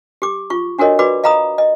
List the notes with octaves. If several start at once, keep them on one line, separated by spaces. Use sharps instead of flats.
G4 D6
F4 C#6
D4 F#4 A4 A#4 C#5 D#5
F#4 B4 D5 B5 D6
D#5 F5 A#5 B5 D#6
D#5